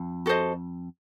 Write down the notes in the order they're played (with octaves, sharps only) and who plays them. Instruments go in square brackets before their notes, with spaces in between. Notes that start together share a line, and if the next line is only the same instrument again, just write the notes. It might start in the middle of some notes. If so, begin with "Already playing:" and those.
Already playing: [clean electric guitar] F2
[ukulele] F#4 A4 C5 D#5